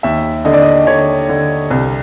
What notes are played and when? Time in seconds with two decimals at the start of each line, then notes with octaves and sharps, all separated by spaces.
0.03 D#2 E5
0.45 D3 D#5
0.53 D5
0.62 D#5
0.87 D3 C#5
1.29 D3
1.71 C2